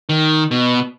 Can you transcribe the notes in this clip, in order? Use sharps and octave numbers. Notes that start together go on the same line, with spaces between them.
D#3
B2